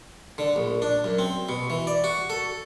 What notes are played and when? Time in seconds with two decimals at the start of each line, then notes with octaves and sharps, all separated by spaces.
0.38 D3
0.56 A#1
0.82 D4
1.04 F#2
1.19 C4
1.49 B2
1.70 E3
1.87 D5
2.04 F#4
2.30 A4